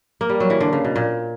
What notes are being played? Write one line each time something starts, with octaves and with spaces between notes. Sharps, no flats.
A#3
G3
F#3
E3
D3
C#3
B2
A#2